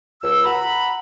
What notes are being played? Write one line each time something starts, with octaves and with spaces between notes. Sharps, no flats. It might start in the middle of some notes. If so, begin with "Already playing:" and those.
C#2 E6
F#5 A#5 B5